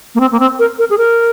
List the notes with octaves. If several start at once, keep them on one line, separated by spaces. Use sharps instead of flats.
A#3
C4
A#3
C4
A#4
A#4
G#4
A#4